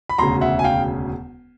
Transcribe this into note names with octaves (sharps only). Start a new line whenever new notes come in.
B5
E1 D2 C#3 A#5 C6
E5 F#5
G#5
F5 G5